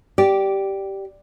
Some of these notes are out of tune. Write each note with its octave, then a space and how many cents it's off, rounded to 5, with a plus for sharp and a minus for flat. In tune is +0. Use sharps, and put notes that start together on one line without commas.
G4 -10 D5 +0